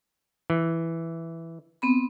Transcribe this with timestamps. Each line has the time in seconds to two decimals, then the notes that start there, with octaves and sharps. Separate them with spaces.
0.50 E3
1.82 B3 C4 B5